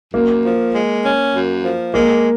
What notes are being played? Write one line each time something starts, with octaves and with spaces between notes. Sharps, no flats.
F#2 A#3
F3
G#3
C#4
F#2
F3
G#3 A#3